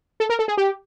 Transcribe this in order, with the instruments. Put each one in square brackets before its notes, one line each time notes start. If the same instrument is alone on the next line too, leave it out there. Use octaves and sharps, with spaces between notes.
[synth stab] A4
A#4
A4
G#4
G4